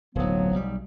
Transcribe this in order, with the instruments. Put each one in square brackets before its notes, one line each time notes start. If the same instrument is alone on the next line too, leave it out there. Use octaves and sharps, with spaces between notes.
[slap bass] D1 B1 [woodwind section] F3 F#3 B3
[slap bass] B1 G3